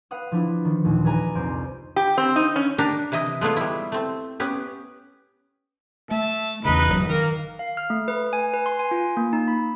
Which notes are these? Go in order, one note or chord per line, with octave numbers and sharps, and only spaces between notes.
B4 F5 F#5 D#6
F3 D4 E4
D#3
A1 D#2 A#2
G#4 B4 D5 D#5 G#5 A#5
C2 F2 C4 C5 G6 D7
G4
C4
D#4
C#4
D4 G4 A#4
C3 E3 E4 D#5
G#3 A3 B3 F4 C#5
G3 E4
A3 C4
B3 C#4 G4
A3 E5 A5
E2 C#3 D#4 B4 B5
G1 C#3 F#3
D#3 A#3 A#4 A#5
F5
F6
A3
B4
G#5
B4
C6
G#5
F4
A#3
D#4
B5